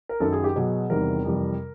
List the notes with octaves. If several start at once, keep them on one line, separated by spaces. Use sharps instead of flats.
A#4
F#2 D#3 F#3 A4
G#4
G4
B2 F#3 G#4
E2 C3 D#3 G3 A#4
F2 C3 E3 G3